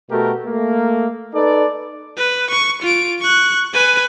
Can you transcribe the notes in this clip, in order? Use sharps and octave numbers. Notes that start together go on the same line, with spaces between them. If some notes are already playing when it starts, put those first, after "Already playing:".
B2 A3 F#4 G4 A#4
A3 A#3
D#4 A4 B4 D5
B4
C#6
F4 D7
C#6 F#6
B4 G#5